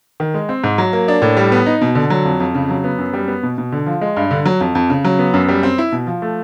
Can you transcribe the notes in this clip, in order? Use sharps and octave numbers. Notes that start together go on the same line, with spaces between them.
D#3
G#3
C4
G#2
F#3
A#3
D4
A2
G3
B3
D#4
B2
D3
F#3
F2
F2
C#3
F#3
B3
F#2
G3
B3
B2
B2
D3
F3
G#3
G2
D3
F#3
F2
F2
C#3
F#3
B3
F#2
G3
C4
E4
B2
F3
A3